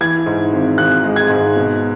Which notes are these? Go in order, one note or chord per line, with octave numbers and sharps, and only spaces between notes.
E3 G#6
G#2
G#1
G#1 F#6
G#3
G#6
G#2
B2